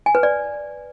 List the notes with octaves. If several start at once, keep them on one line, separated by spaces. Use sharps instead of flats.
G#5
B4
D5